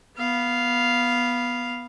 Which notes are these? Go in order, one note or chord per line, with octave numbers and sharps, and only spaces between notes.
B3 F5